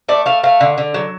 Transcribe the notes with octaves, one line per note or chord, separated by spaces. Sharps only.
A3 D5
A3 F5
A3 F5
D3
D3
F#3